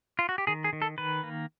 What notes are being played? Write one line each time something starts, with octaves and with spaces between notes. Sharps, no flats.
F4
F#4
G4
D#3 G#4
G#4
D#3
A4
D#3 B4
A#3